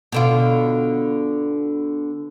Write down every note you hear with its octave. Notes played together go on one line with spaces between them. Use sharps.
B2 D3 F4